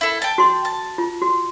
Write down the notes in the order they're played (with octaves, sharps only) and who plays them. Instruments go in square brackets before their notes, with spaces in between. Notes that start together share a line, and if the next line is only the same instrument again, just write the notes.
[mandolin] E4 A4
G5 A5
[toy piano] F#4 C6
[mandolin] A5
[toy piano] F4
F#4